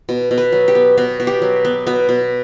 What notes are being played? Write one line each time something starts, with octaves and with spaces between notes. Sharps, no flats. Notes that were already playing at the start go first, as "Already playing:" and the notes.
B2
B2
B4
F#3
G4
B3
B2 F#4
B2
G4
F#3
B3
B2 B3
B2